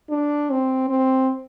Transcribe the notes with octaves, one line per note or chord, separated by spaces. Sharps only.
D4
C4
C4